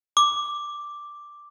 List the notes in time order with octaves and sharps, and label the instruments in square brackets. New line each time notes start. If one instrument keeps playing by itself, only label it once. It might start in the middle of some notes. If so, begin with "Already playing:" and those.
[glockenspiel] D6